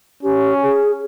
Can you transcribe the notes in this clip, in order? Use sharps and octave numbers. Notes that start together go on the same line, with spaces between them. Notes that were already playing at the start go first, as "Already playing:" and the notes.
C#4 G4
G#4